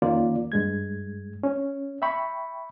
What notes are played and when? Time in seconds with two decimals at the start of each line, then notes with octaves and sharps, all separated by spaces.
0.02 F2 D#3 A#3 C#4 F4 D5
0.52 G2 G#3 G#6
1.43 C#4
2.02 E5 G5 B5 C#6